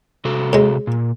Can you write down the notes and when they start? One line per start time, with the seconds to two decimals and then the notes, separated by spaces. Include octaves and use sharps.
0.25 C3 F#4 A4
0.53 A2 G#3
0.87 A#2